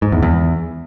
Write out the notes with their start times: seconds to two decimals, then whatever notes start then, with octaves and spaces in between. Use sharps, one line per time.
0.02 G#2
0.12 E2
0.22 E2